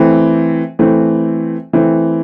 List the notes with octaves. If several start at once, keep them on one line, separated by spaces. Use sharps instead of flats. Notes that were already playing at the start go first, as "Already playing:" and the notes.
Already playing: E3 A3 C4
E3 A3 C4
E3 A3 C4